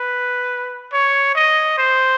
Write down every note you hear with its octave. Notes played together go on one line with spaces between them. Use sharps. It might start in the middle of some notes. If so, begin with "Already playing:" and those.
Already playing: B4
C#5
D#5
C5